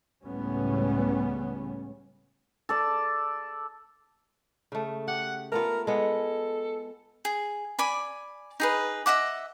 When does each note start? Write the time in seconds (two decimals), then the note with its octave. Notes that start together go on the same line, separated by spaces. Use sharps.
0.25 C#2 A2 G3 B3 C#4
2.69 A4 D5
4.72 C#3 A3
5.08 G4 F#5
5.52 A3 B3 F4 A#4
5.87 G#3 B3 A4
7.25 G#4
7.79 D5 G#5 B5
8.60 D#4 G#4 B4
9.06 D#5 E5 F#5 D6